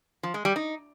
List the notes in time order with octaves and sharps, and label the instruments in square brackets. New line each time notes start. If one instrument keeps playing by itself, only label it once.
[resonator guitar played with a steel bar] F3
G#3
G3
D#4